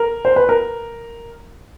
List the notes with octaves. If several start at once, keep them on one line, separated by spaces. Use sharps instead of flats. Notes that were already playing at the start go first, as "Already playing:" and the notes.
Already playing: A#4
C5
B4
A#4